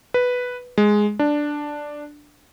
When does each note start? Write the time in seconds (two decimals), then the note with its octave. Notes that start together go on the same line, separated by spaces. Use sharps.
0.14 B4
0.78 G#3
1.19 D4